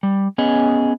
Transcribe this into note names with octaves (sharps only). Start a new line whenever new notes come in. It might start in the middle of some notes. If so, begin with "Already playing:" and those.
G3
B3 C#4 G#4 D#5